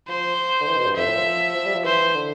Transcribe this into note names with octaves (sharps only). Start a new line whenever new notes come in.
F3 C5
D3
E3
B2
G2
F2 E5
A2
F3
F3
G3
F3
E3 C5
D3